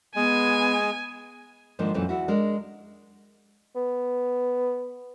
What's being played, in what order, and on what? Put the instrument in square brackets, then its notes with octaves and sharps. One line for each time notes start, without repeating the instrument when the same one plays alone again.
[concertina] G#3 [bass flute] B3 [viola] G#5
[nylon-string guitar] G#2 D#3 F3 A#3 D4
F#2 A#2 E3 A3 A#3 C4
E2 E4 F#4
G#3 D4 A#4
[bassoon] B3